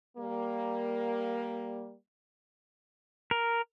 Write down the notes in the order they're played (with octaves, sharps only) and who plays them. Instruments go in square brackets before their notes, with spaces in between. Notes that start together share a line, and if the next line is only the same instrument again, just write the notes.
[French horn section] G3 A#3
[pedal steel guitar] A#4